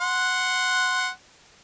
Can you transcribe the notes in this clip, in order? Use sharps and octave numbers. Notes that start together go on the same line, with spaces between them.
F#5 C6